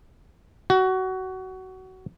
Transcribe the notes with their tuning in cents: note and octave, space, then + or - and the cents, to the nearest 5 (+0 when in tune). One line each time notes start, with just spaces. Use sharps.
F#4 +20